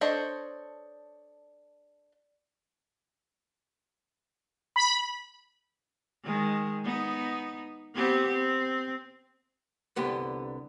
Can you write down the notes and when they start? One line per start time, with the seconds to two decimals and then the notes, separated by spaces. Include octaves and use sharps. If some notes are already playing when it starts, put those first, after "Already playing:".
0.01 D4 A4 C5 C#5 D#5
4.76 B5
6.24 D#3 G#3
6.84 B3 D#4
7.95 B3 C4 G4
8.34 C4
9.96 C2 D3 B3 G4